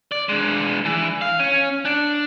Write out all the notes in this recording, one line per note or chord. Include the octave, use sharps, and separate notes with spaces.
D5
G#3 D4
E3
F5
C#4
D4